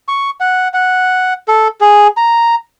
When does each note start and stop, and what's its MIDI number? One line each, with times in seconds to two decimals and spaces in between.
0.08 0.30 85
0.41 0.68 78
0.74 1.33 78
1.48 1.68 69
1.81 2.07 68
2.17 2.55 82